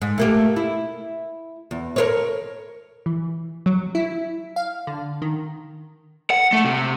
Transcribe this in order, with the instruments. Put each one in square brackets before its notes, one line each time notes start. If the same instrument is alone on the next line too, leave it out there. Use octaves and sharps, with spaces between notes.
[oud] G#2
A3 A#3 G4
E4
E2
A#4 C5 C#5
[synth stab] E3
F#3
E4
F5
D3
D#3
[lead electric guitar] F#5
A3
C3